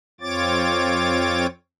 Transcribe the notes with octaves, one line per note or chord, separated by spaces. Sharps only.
F2 C4 F4 C#5 D6 A6